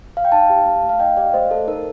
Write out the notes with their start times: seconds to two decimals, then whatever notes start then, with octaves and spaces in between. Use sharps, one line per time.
0.17 F5
0.25 G5
0.32 D#4 F5 A5
0.50 G4
0.66 A3
0.83 A3
0.89 F5
1.00 D#4 D#5 G5
1.16 G4 D5 F5
1.34 A3 C5 D#5
1.51 A3 A4
1.67 D#4 A#4